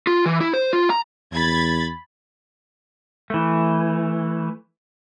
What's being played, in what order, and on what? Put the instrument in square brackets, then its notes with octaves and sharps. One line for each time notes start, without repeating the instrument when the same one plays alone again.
[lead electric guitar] F4
E3
E4
C5
F4
A#5
[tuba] E2 [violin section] B5 G#6 A6
[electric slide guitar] E3 A3